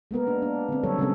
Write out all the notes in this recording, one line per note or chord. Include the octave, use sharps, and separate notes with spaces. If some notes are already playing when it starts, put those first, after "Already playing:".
G#3 A#3 B3 A#4
A#3 D4
D4
D3 C4
D3 F#3 G3 A4 C#5
C#3 G#3 A#3 C4 G#4 A4